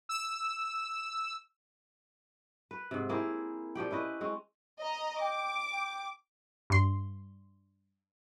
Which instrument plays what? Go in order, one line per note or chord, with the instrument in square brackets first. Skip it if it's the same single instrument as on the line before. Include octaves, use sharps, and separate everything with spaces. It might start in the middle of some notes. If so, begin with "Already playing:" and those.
[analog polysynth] E6
[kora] B4
G#2 C3
A#3 C4 E4 G#4
A#2 F3 G4 G5
C#4 E4 B4 D#5
G#3 C4 C#4
[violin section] D#5 A#5
[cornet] G5 [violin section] D6
[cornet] G5
[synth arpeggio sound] G2 C6